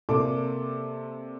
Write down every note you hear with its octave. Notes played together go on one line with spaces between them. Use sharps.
C3 A#3 A4 D5 D6